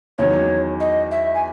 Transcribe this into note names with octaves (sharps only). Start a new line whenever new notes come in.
E2 D#3 F#3 C#4 C#5
D#5
E5
G#5